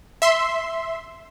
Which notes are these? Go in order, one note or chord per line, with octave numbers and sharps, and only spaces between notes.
E5 C6